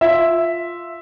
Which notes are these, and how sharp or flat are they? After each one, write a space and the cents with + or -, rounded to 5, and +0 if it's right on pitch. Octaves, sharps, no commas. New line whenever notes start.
F4 +0 E5 +0